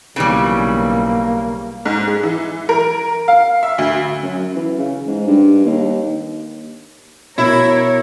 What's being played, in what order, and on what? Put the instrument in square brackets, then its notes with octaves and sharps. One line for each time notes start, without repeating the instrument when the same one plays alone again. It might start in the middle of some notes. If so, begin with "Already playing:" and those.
[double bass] B1 [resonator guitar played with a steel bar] C#3 E3 G3 [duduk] A#3
[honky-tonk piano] G#2
G#4
E3
A#4
F5
E5
D2
[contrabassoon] F#2
E3
C#3
G#2
G2
D#2
[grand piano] B2 [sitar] E4 [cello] A#4 C#5